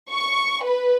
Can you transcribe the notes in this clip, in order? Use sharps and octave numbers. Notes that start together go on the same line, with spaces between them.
C#6
B4